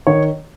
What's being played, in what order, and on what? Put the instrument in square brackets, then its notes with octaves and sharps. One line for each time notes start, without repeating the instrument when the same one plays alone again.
[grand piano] D#3 C#5